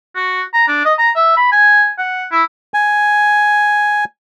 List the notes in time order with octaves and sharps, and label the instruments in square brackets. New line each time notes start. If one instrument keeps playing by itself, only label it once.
[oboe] F#4
A#5
D4
D#5
A#5
E5
B5
G#5
F#5
E4
[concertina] G#5